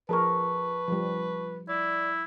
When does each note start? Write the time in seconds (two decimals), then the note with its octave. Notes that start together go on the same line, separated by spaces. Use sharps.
0.09 F3 G#4 A#4 B4 A5 C#6
0.88 F3 G3
1.69 E4 D5